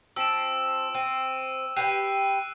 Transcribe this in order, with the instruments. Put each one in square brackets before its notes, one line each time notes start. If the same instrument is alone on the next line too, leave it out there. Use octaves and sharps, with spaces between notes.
[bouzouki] F3 C4 [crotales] E6 D7 E7
[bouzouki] C4 [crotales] D#7
[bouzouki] G4 B4 G5 [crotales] F#6 C7 D#7